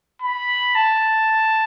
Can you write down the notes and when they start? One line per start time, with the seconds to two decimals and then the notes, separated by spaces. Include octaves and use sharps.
0.22 B5
0.75 A5